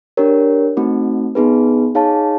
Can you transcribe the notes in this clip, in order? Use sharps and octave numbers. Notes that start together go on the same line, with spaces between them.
D4 G4 A#4 C#5
A3 C4 D#4 F#4
B3 D#4 G#4 B4
D#4 G#4 C#5 F5 A5